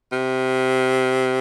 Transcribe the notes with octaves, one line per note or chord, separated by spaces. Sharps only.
C3